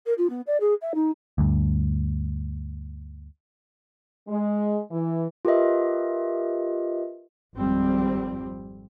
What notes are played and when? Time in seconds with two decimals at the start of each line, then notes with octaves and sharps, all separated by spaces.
0.06 A#4
0.18 F4
0.29 B3
0.46 D5
0.60 G#4
0.81 E5
0.94 D#4
1.38 D2 G2
4.29 G#3
4.91 E3
5.45 F4 G4 A#4 B4 D#5 E5
7.55 G#1 F2 F3 G3 C4